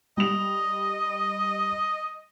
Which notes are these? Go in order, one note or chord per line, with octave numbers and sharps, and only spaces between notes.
G3 D#5 F7